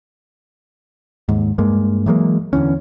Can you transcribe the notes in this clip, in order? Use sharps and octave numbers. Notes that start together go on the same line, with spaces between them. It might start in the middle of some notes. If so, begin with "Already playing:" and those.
D#2 G#2
G2 G#3 A#3
E3 F#3 G#3 A#3
E2 D3 E3 C#4